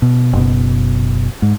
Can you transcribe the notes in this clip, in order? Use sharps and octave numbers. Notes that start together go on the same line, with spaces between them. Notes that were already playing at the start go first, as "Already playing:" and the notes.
B2
F#1 B2
G#2